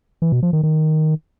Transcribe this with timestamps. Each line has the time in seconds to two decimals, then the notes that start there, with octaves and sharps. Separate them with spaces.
0.22 E3
0.32 B2
0.43 F3
0.53 D#3
0.63 D#3